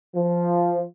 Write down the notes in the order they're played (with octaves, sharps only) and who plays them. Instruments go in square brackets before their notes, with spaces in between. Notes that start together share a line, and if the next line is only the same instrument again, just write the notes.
[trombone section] F3